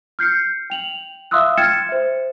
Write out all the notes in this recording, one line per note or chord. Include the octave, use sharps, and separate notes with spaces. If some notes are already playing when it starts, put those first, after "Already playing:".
F6 G6 C7 C#7
G5 F7 F#7
E5 F5 C6 D#6 E6 F#6
G5 F6 G#6 A6 C#7 E7
C5 E5